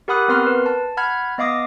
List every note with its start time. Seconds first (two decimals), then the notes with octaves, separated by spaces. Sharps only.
0.08 G4 A#4 F#5 B5 D#6 F#6
0.28 B3 C4 A#4 C6 F6
0.47 B4
0.66 A5
0.97 F#5 B5 F6 G#6
1.38 B3 D#5 F5 D6 D#6 A#6